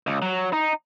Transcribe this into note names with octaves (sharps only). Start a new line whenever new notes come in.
C#2
F#3
D#4